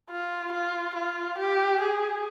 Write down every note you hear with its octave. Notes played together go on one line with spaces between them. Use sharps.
F4
F4
F4
G4
G#4